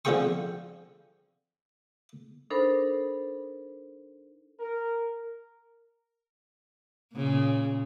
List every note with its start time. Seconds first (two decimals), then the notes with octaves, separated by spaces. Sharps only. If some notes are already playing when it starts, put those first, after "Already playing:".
0.05 D3 F3 C4 G#4 G5 C#6
2.50 D4 D#4 A4 A#4 C5 B5
4.60 A#4
7.14 A#2 C#3